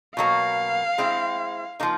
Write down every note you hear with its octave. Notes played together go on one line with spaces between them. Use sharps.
B2 F#3 A#3 F5
G#3 C4 E4
F3 A#3 D#4